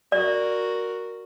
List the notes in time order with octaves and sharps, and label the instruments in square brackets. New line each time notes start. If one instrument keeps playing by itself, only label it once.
[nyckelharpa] F#4 A#4 [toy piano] D5